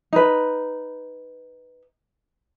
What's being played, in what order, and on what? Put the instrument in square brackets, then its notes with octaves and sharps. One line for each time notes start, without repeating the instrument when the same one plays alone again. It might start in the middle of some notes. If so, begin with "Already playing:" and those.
[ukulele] D#4 B4